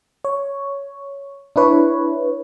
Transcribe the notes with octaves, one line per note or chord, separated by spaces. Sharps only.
C#5
D4 E4 B4 C#5